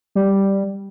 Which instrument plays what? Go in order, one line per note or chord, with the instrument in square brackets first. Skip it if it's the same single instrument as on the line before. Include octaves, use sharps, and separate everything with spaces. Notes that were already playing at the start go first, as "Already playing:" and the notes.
[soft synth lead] G3